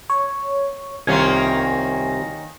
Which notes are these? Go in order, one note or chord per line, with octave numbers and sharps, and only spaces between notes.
C#5
C2 D#3 A#3 C#4 F4 G#5